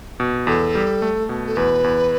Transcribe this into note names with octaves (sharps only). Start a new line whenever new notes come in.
B2
E2 A4
G3
A3
B2
A4
E2 B4
E2